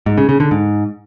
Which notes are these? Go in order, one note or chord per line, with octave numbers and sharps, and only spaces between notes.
G#2
C#3
C#3
D3
G#2